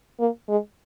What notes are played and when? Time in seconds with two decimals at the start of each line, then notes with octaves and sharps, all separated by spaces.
0.19 A#3
0.49 G#3